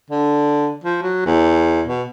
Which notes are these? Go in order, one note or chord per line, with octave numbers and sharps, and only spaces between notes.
D3
F3
F#3
E2
B2